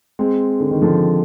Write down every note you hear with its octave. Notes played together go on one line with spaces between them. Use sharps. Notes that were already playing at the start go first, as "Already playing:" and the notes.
G#3 C4
D3
D#3
D3 F3